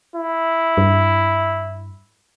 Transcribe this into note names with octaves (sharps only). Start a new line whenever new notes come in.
E4
G2